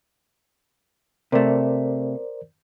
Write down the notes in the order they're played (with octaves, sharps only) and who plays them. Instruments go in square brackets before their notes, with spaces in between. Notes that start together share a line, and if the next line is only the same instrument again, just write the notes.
[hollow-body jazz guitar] C3 A3 [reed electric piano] A#4 C5 D5